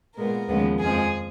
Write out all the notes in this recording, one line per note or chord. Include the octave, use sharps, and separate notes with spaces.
A#2 G#3 B3 A#4
D#2 C#3 F3 G#3 B3
F2 F3 G#3 G#4